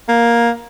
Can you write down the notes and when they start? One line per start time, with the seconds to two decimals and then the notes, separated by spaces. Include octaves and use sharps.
0.09 A#3